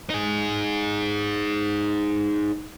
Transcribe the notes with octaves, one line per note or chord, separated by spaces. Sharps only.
D#4 G#4